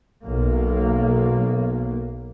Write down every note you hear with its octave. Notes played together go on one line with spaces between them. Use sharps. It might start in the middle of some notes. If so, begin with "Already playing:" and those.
B1 A#3